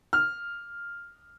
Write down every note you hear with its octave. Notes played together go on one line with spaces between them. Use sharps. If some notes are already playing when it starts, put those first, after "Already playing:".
F6